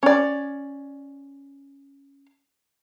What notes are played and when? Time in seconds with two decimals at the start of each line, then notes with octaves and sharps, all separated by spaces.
0.03 C#4 D5